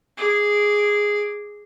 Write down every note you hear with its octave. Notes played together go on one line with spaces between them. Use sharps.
G#4 D6